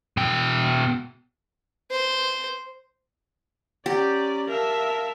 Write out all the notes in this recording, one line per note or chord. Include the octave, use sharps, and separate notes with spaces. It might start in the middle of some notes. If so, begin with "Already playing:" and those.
B2 G5
C5
C#4 G4 D5 A#5
A#4 E5 F5 A5